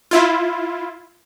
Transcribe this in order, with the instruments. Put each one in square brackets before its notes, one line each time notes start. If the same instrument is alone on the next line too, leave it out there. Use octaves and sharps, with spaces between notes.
[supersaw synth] E4 F4